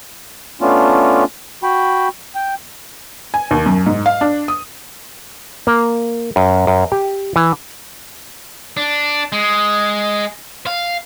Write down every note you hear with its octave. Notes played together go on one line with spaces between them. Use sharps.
A3 B3 C#4 D4 F4
F#4 G5 B5
G5
G#5
D#2
F#2
G#2
F5
D4
D#6
A#3
F#2
F#2
G4
E3
D4
G#3
F5